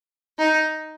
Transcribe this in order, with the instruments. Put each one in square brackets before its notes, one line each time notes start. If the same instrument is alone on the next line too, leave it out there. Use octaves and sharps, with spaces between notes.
[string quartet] D#4